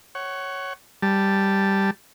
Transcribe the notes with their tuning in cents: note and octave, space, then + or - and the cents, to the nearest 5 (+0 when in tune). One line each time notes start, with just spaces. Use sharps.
C#5 +0 F#5 +25
G3 +0 A5 +0